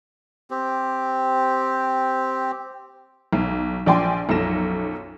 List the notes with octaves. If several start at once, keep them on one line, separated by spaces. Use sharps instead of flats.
C4 G4
B1
A#1 F3 D5 G5 G#5 C6
B1 F#2 F3 A4 A#6 E7